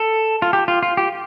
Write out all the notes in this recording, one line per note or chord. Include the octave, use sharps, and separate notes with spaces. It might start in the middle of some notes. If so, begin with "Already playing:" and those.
Already playing: A4
F4
G4
F4
F4
G4